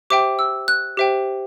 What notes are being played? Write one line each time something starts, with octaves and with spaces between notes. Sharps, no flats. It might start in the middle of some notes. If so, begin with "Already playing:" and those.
G4 C5 E5 G5 D6
E6
F#6
G4 C5 E5 G5